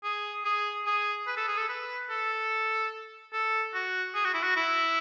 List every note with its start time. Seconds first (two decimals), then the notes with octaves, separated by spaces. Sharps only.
0.04 G#4
0.45 G#4
0.86 G#4
1.27 B4
1.37 A4
1.48 G#4
1.58 A4
1.69 B4
2.10 A4
3.33 A4
3.74 F#4
4.15 G#4
4.25 F#4
4.34 E4
4.43 F#4
4.56 E4